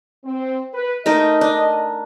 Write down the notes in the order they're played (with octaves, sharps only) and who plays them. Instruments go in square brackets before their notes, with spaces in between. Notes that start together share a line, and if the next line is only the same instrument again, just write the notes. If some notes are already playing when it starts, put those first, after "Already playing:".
[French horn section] C4
B4
[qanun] A3 D#4 A#4 [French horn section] D#5
[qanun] D4